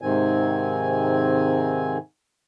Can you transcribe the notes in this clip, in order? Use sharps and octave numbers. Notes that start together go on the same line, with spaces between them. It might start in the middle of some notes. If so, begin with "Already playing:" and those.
G#2 C3 D#3 C4 G#5